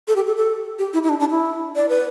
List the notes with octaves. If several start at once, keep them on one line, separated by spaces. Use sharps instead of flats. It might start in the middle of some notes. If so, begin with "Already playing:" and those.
A4
G4
A4
A4
G4
E4
E4
D4
D4
E4
D5
B4